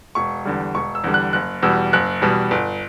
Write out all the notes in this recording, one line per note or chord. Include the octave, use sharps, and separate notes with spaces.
E1 C#6
E2 D3 G3
E1 C#6
E6
E2 D3 G3
F#6
F#1 F#6
E2 B2 G3 E6
F#1 F#6
E2 B2 G3
G1